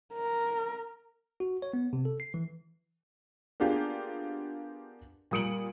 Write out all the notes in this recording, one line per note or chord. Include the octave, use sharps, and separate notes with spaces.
A#4
F#4
C#5
B3
C3
A4
C7
E3
A#3 B3 D4 F4 G4 G#4
A#2 G3 D#6 C#7 D7 F#7